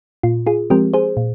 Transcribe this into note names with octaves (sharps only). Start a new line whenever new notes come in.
A#2 F4
F4 G#4
F3 G#3 C4 G4 A#4
G#4 C5
A#2